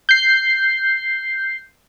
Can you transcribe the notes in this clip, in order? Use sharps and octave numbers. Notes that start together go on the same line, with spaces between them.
G6 C7